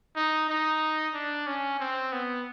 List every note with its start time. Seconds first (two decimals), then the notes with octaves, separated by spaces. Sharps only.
0.16 D#4
0.49 D#4
1.14 D4
1.47 C#4
1.80 C4
2.12 B3